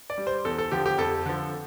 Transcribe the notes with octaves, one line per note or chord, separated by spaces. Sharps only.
D5
G3
C5
E2 A4
A4
D3 F3 G4
G4
F2 A4
D3 F3